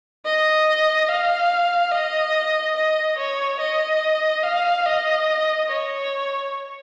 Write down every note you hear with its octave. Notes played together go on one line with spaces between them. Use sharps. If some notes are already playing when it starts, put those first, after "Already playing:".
D#5
F5
D#5
D#5
C#5
D#5
F5
D#5
C#5